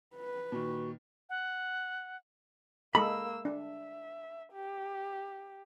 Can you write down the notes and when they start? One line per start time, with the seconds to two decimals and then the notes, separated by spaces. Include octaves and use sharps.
0.15 B4
0.52 A#2 D#3 F#4
1.29 F#5
2.95 G#3 A#3 A4 D#5 B5 E6
3.45 D4 E5
4.53 G4